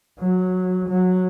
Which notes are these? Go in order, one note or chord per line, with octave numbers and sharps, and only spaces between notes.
F#3
F#3